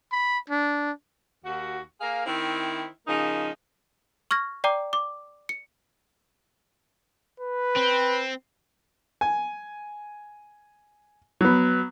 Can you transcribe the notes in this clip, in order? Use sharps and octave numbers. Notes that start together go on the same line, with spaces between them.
B5
D4
D#2 F#4
A#3 G#4 A#4 F5
D#3 C4 E4
C#3 F3 A#3 D#4
C#6 F6 G#6 A#6
D5 G5 A#5 D6
D6
C#7
B4
C4
G#5
F#3 B3